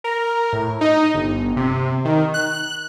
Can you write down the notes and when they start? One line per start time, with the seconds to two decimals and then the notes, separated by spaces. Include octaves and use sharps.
0.04 A#4
0.53 A2
0.81 D#4
1.14 G1
1.56 C3
2.05 D#3
2.34 F#6